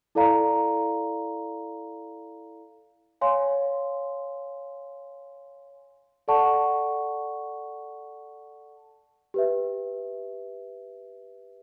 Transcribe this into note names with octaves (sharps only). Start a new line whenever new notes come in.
E4 A4 D5 F5 A#5
C#5 F5 G#5 C6
A4 D5 F#5 A5 C#6
G4 B4 E5